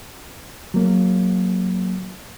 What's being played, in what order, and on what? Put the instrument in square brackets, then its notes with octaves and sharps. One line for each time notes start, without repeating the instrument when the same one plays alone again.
[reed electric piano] F#3 A#3